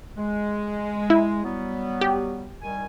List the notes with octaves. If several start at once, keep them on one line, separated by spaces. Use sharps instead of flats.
G#3
E4
F#3 G3 B3
G4
D#3 G3 G#5